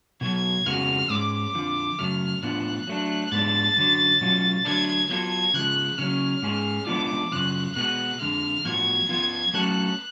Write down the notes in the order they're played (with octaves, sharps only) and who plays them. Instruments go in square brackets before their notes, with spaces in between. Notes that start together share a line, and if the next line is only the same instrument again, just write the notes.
[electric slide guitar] B2 F#3 B3 [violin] G#6
[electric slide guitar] F2 C#3 G#3 B3 F#4 [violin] F6
[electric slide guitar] G#2 G#3 C#4 [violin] D6
[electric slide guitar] F2 D3 F3
[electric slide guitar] F#2 C#3 F#3 A3 [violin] F6
[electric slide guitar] A2 F3 B3 D4 F4 [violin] F#6
[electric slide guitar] F#3 A3 D4
[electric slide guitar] G#2 G#3 B3 D4 [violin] A6
[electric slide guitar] F#2 D3 F#3
B2 F#3 C#4 F4
[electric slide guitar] D3 F#3 A3 D4 [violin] G#6
[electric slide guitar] F#3 B3 F4 A4 [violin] G#6
[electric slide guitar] C#3 F3 G#3 [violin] F#6
[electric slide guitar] C#3 F#3 C#4 [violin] F6
[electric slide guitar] G#2 G#3 C#4 G#4
[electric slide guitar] F3 G#3 B3 D4 F4 [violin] D6
[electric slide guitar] F#2 C#3 F3 [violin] F#6
[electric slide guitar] B2 G#3 B3 F#4 [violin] F#6
[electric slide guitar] F2 D3 G#3 [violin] F6
[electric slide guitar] A2 F3 B3 F#4 [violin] G#6
[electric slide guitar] F3 B3 F4 [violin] G#6
[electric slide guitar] F#3 A3 C#4 F#4 A4 [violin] F#6